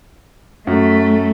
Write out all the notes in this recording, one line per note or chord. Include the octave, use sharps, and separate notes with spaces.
F#2 A3